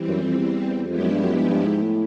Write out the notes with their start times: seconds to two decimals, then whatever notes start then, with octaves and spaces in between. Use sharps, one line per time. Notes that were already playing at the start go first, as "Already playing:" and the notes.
Already playing: E3 G3 C4
0.08 F#2
0.24 F2
0.39 E2
0.87 F2 F3 G#3 B3 E4 G4
0.99 F#2
1.11 G2
1.23 F#2
1.34 G2
1.50 G2
1.66 G#2
1.82 A2